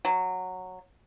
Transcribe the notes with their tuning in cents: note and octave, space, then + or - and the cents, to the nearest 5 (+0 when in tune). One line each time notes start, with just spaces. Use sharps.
F#3 -5